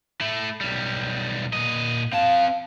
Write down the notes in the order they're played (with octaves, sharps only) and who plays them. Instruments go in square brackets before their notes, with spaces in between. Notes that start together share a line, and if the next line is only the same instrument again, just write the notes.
[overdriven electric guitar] A3 E4
B1 G3
A#2 D#5
[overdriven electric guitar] C4 A5 [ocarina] F5